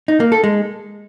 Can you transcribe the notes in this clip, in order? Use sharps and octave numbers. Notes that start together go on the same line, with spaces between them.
D#4
A#3
A4
G#3